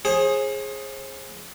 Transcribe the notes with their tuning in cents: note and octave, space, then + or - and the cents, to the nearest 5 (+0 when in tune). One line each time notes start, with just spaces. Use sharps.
G#4 +0 C5 +40